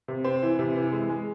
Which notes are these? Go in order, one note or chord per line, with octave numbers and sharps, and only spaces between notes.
C3
C4
E3
C3
E3
G#3
G#3